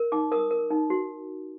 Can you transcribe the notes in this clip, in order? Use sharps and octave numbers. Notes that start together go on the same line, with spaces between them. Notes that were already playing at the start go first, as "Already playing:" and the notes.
Already playing: A#4
D#4 D6
A#4 D#6
A#4
D#4
F#4